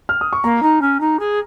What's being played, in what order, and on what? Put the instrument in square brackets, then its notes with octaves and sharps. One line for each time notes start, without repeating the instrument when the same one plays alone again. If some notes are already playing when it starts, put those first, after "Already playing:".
[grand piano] F6
D#6
C#6
[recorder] A#3 [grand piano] A#5
[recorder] D#4
C#4
D#4
G#4